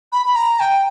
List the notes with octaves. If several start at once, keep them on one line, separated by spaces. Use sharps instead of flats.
B5
B5
A#5
G5